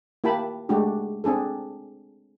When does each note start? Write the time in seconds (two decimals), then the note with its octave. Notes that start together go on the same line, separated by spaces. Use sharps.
0.24 A#3 E4 G4 G5 A5 B5
0.69 G#3 A3 D4 F#4 G4
1.24 C4 D4 G#4 A4